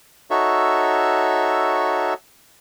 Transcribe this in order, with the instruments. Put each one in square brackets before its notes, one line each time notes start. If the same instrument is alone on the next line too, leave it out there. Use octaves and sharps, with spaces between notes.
[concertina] D#4 F#4 A4 C#5 E5